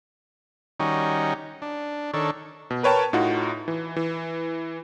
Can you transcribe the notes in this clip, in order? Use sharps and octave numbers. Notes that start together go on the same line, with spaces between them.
D#3 G3 C#4 D#4 F#4
D4
D#3 D4 A4 C#5
B2
A#4 B4 C#5 G5 A5
A2 D#4 F4 F#4
E3
E3